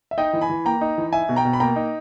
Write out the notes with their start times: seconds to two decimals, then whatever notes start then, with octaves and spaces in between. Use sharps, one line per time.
0.11 E5
0.18 D#4 D#5 G5
0.33 E3
0.41 G#5 B5
0.49 E3
0.65 A#3 G5 A#5
0.81 D#4
0.98 E3
1.13 D#4 E5 G#5
1.29 B2
1.36 G5 A#5
1.45 B2
1.53 B5
1.60 A#3 G5 A#5
1.76 D#4